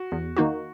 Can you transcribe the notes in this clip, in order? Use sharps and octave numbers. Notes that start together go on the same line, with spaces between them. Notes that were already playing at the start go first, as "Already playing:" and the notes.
Already playing: F#4
E2
D#3 A#3 D#4 F#4